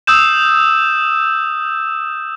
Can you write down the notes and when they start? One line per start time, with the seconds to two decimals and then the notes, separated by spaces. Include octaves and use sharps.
0.07 D#6 E6 G6 E7